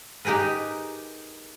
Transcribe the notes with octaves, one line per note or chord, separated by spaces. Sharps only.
D#4 G4 G#4 A#4 B4